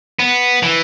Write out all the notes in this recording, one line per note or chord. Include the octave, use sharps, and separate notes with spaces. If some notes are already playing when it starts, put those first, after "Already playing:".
B3
E3